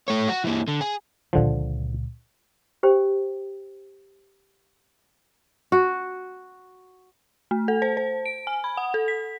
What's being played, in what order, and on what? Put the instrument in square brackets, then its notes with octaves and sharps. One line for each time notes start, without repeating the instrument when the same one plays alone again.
[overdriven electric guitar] A3 C#5
F#4
E3 A#3
D3
G#4
[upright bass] C#2 A#2 [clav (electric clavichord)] D3 F3
[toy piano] G4 C5 G5
[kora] F#4
[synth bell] A3
A4
C5
C5
D7
G#5
B5
F#5
A4
B6